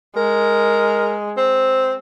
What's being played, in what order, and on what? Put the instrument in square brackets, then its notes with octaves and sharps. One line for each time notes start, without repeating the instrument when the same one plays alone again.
[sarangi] G#3 [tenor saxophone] A#4
[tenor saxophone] C4